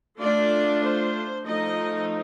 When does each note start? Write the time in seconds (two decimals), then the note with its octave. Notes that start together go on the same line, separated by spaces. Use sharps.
0.18 A3 D4 F4 D5
0.82 C5
1.44 F3 A3 D#4 D#5